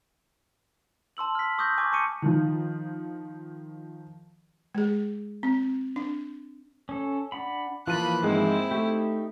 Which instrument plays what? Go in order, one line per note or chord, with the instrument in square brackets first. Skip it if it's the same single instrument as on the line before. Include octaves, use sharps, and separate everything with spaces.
[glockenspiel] A5 C6 E6 F#7
F6 B6
C#6 D#6 E6 G6 A#6
G#5 C#6 D6 G#6
A5 C#6 D6 C#7 D#7
[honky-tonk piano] D#3 F3
[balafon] G#3 G#4
C4
D4
[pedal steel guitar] C#4 A4
D4 F#5 B5
[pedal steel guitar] E3 F3 A#3 [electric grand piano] F4 A5 D#7 [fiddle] B5 F#6
[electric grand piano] G#2 G#3 [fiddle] C4 E4
[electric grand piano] A3 [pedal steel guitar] D#4 G4